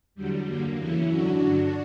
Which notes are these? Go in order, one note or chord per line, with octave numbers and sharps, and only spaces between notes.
E2 D3 F#3 G3
F#2 D3 F#3 A#3
E2 C#3 E3 C#4 E4
F#2 D3 F#3 D4 F#4
G2 D3 F#3